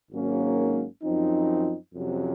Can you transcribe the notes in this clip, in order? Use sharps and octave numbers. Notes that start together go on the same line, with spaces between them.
G#1 G#2 F#3 A#3 C#4
F#2 F3 C4 D#4
F2 C3 F#3 C#4